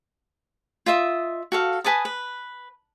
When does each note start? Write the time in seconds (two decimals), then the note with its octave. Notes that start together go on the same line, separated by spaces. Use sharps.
0.86 F4 D#5 E5 D#6
1.52 F#4 A4 F5
1.84 B4 G#5 A5 D#6
2.05 B4